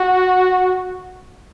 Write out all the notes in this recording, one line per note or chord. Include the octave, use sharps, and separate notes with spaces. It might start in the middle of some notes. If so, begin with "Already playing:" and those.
Already playing: F#4